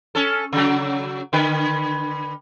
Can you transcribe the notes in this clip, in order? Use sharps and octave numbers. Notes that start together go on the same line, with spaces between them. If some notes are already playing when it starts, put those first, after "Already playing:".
C#4 A4
C#3 F#3
D3 B4